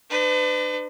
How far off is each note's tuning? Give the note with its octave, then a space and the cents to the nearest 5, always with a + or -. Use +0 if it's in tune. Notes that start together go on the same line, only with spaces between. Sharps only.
D4 +40 B4 +45